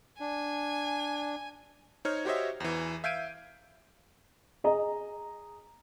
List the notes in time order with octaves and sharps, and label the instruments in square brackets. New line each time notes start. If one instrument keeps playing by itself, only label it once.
[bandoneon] D4 [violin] G#5
[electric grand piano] D#4 C5 C#5 F6
F#4 G4 C5 C#5 D#5 E5
E2 E3
E5 F5 G6 G#6 D7 D#7
[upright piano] G#4 D#5 A#5